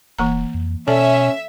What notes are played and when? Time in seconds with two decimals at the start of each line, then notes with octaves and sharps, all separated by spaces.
0.19 E1 E3 A#3 A#5
0.54 F2
0.88 B2 C#4 A4 D5 E5 A5